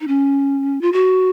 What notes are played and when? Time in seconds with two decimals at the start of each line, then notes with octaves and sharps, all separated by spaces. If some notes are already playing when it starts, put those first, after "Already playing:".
0.01 D#4
0.08 C#4
0.81 F4
0.93 F#4